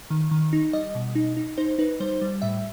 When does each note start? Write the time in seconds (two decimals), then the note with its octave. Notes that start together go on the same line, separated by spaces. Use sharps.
0.10 D#3
0.31 D#3
0.53 D#4
0.73 G3 D#5
0.95 B2
1.15 D#4
1.37 D#4
1.57 D#4 C5
1.78 D#4 B4
2.00 G3 C5
2.21 G3
2.42 A2 E5